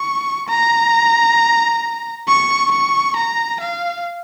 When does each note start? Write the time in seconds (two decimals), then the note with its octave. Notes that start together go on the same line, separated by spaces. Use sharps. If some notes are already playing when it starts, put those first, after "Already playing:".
Already playing: C#6
0.49 A#5
2.28 C#6
2.71 C#6
3.16 A#5
3.61 F5